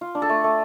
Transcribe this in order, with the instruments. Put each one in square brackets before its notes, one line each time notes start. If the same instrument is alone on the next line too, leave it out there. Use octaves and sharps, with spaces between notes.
[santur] F4
D4
A4
A3
A3